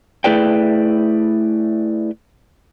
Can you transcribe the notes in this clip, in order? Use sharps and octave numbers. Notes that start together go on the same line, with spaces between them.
A3 E4 G#4 B4 D5 G5